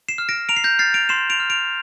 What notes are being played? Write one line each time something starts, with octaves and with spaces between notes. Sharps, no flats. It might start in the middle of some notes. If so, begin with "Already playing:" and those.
C7 E7
F6
A#6 D7
A#5 D7 F7
C7
G6 A#6
F6 A6 C7
D7 F7
C6 C7 E7
D7 F7
F6
D7 F7